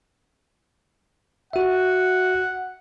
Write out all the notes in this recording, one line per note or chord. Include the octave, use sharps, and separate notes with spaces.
F#4 E5 F#5